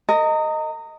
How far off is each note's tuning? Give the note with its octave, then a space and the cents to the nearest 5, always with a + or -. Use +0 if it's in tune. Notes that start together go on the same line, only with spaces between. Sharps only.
A#4 -30 D#5 +0